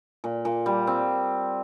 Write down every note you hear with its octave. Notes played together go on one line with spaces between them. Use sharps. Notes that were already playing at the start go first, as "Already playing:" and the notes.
A#2
A#2
G3
C4